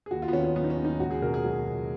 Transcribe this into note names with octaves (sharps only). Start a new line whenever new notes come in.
G#4
D#2 F#4
F4
B3
D#3 C#4
C#4
F#3 B3
D#4
C#4
D#2
D#4
C#2 F#4
G#4
B2 A#4
G#4
F#3
C#2